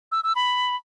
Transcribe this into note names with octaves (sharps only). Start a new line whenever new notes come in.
E6
E6
B5